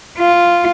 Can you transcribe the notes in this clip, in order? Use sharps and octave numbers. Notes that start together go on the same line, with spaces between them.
F4